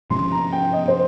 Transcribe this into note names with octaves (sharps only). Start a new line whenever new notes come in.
C3 F3 G#3 C#4 C6
A#5
G5
D#5
C5